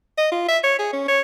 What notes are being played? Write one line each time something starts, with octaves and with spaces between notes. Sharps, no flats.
D#5
F4
E5
C#5
G#4
C#4
C#5